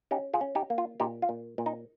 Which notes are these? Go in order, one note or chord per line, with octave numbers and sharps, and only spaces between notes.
C#4 D#4 G4
F4 G#4
C#4
D#4 G4
A#3
F4
A#2 D#4 G4
F4
A#2
A#2
D#4